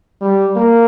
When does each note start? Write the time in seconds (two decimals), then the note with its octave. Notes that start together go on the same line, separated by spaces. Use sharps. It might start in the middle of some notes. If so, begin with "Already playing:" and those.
0.21 G3
0.56 A#3